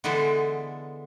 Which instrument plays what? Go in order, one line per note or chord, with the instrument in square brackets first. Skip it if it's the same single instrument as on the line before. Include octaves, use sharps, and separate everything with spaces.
[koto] D3 E3 G#3 B3 E4 A4